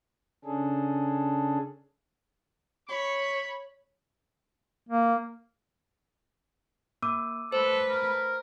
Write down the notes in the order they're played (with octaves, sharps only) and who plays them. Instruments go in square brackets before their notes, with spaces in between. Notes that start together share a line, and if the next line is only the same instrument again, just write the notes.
[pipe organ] C#3 C#4 D4 G#4 A4
[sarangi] C#5 [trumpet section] B5 C#6
[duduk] A#3
[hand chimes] A#3 [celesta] D6 E6 D#7
[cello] A3 B4 [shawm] A4 [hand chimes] C5
[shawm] A#4